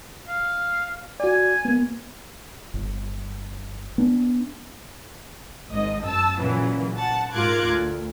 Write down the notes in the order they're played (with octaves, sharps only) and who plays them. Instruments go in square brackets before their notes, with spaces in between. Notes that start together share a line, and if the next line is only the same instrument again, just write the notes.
[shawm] F5
[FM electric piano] F#4 D5 [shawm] G#5
[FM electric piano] A#3 B3
[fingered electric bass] G1
B3 D4
[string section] G#1 G#2 D#5
F#2 A5 E6
A#2 C#3 E3 F#3
F#5 A5
G#2 F4 A#4 D6 F#6 G#6
D2